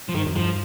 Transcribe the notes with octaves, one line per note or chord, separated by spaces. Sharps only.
F3
G2 D#3
F2
G2 F3